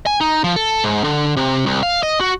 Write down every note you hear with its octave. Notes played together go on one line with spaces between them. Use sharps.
G#5
D#4
F3
A4
G#2
D3
C3
C2
F5
D#5
F#4